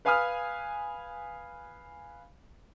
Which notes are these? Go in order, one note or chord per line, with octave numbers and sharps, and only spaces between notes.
B4 F5 G#5 B5 D#6 F6